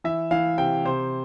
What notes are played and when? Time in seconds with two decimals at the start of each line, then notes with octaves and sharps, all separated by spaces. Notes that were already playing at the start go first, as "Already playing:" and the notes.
0.04 E3 E5
0.31 E3 F5
0.58 C3 G5
0.85 C3 C5